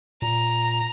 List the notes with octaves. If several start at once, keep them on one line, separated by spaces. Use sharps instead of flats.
A#2 A#5